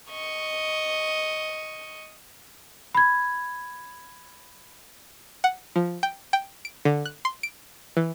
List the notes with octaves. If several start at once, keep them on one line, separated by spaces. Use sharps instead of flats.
D#5 C#6
B5 G#6
F#5
F3
G5
G5
D7
D3
F#6
C6
D7
E3